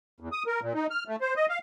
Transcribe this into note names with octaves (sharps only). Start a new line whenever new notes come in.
E2
D#6
A#4
A#2
D#4
F6
A3
C5
D#5
F5